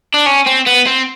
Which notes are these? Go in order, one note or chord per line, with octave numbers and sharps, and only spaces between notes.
D4
C#4
C4
B3
C4